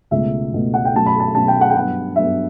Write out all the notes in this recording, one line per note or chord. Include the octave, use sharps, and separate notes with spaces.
C#2 B2 A3 E5
C#2 B2 A3
F#5
G5
B2 F#3 A3 C#4 A5
B5
A5
B2 F#3 A3 C#4 A5
G5
F#5
G5
G2 F#3 B3 F#5
G2 F#3 B3 E5